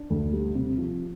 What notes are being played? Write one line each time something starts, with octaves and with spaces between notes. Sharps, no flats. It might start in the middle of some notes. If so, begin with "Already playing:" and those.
Already playing: D4
D2
G3
C3
F3